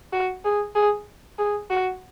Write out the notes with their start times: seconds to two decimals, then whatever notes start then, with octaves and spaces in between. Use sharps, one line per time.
0.13 F#4
0.44 G#4
0.75 G#4
1.38 G#4
1.70 F#4